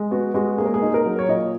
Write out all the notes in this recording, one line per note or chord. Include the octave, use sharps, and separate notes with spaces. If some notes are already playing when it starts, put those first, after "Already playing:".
Already playing: G#3
B3 F#4
G#3 F#4
A#3 G#4
A#4
G#4
D#4
A#4
F#3
C#5
A#2 D#5